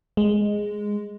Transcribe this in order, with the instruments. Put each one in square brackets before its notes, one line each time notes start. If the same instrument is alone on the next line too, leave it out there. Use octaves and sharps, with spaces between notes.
[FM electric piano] G#3